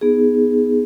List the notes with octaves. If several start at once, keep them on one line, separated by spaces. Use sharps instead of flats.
B3 D#4 G#4